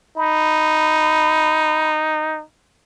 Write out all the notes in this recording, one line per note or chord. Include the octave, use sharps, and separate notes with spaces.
D#4 B5